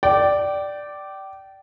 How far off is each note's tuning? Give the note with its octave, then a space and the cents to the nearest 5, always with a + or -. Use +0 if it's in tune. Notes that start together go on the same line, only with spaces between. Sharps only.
D5 +0 G5 -25